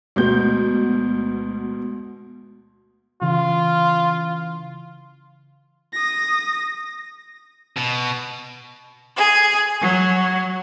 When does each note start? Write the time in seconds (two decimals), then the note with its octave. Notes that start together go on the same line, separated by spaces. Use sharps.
0.16 D2 B2 G#3 B3 F#4 G6
3.22 C#3 E3 F4
5.93 D#6 A#6
7.77 B2
9.16 G#4
9.81 F#3